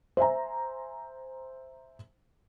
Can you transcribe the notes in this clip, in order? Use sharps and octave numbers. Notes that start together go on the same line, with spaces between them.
C5 E5 G#5 A#5